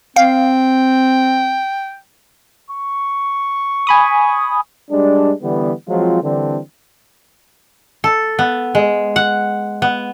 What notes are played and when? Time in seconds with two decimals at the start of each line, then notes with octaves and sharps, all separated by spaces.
0.16 C4 F5 G5
2.70 C#6
3.87 G#5 B5 D#6
4.91 G3 G#3 D4
5.42 D3 E3 G3 B3
5.88 F3 F#3 G#3 C4 F4
6.22 D3 E3 G3 C4 D4
8.04 A4
8.39 B3
8.75 G#3
9.16 F#5
9.82 B3